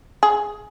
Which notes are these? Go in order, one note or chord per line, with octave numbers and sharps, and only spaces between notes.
G#4